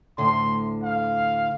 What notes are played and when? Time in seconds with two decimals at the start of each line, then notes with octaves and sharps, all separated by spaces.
0.18 D2 A2 D3 C6
0.83 F5